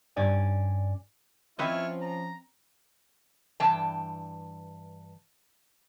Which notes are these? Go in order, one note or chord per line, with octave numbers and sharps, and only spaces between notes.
G2 C#4 D5 G#5
F3 C4 C#4 E4 F4 B4 C#5 D#5
A#5
G2 E3 G5 A5